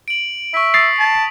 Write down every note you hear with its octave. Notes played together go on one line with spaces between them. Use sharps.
D7 F#7
E5 C#6 B6
D#6 A6 C7
A5